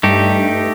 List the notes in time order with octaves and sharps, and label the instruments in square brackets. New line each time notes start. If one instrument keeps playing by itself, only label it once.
[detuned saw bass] G2 [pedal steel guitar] A3 D#4 G4